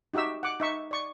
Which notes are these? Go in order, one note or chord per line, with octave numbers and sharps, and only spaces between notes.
D#4 F#4 G4 E5 E6
F#5 D6
D#4 E5 C#6
D5 C#6